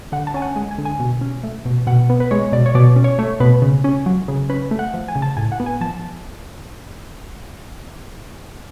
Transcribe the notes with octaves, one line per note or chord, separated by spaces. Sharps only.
D3 F#5
A5
C#4 G#5
F#5
G#3 G#5
G#5
D3
G#5
B2
C#4
A3
B2
B2 F#5
B3
B4
G#3 C#5
B2 D5
C#5
B2 D5
C#4
C#5
A3 C#5
B2 B4
C#3
C#4
F#3
C#3
C#4 B4
A3
F#5
F3
G#5
C#3
A5
A2 G#5
F#5
B3
G#5
F3 A5